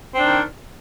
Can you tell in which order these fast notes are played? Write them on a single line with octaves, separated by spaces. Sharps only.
C4 D4 D#3